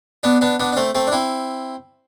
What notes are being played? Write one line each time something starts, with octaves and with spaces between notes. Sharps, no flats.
B3 D4
B3 D4
B3 D4
D4
A3 C4
A3 C4
D4
C4 E4